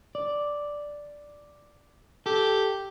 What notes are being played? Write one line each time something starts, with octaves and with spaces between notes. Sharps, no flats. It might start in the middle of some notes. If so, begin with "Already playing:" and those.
D5
G4 A4